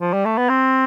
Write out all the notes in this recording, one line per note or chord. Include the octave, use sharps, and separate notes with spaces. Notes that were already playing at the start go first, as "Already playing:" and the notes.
F3
G3
A3
B3
C4